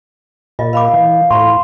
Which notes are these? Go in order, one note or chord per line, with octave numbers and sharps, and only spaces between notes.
A#2 F4 D#5
A#4 F5 B5 D6
E3
A2 F4 A#5 C6 C#6